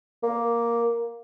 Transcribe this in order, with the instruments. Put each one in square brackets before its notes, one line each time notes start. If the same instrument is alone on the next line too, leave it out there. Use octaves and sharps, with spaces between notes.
[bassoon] A#3